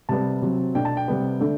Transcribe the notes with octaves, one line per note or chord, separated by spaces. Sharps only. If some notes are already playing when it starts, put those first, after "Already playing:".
C3 G3 B3 A5
C3 F#3 C4
B2 A3 D4 G5
A5
G5
C3 G3 B3
D3 A3 D4